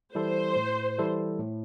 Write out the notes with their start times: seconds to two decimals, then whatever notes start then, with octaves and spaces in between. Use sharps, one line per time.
0.15 E3 G3 E4 A4 C5
0.56 A2
0.98 E3 G3 E4 A4
1.39 A2